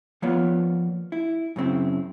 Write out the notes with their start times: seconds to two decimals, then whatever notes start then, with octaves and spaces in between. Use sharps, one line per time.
0.22 F3 A#3 B3 F4 C#5 D5
1.12 E4
1.56 F#2 C#3 C4 E4